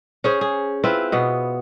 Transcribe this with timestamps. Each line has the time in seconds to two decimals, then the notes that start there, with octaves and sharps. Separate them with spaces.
0.24 C#4 G#4 C5
0.41 G#4
0.84 C4 E4 F4 B4
1.12 B2 B3